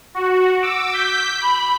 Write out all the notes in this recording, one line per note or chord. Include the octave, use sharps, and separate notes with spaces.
F#4
D6 E6
G6 B6
B5